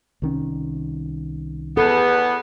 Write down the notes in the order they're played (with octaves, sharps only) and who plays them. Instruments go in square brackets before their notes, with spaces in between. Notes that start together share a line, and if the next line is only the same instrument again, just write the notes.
[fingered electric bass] C2 D#3 C#4
[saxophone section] E2 B3 [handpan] A4